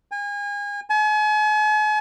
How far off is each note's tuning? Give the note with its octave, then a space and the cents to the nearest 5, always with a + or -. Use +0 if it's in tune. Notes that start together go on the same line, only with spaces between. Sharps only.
G#5 -35
G#5 +40